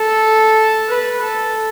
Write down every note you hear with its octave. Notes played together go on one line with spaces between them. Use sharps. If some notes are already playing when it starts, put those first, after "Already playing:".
Already playing: A4
B4
A4